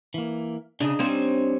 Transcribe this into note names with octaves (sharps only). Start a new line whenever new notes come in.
E3 A#3
C#3 D4 D#4 D#5
G3 C4 C#4